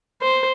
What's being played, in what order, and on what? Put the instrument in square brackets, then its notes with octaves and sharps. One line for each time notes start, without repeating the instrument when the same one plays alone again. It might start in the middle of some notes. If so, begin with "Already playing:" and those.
[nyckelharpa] C5